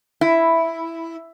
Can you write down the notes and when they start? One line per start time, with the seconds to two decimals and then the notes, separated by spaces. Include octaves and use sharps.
0.21 E4